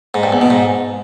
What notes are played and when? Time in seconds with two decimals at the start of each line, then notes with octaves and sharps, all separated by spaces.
0.14 G#2
0.23 G2
0.32 E2
0.41 B2
0.50 G#2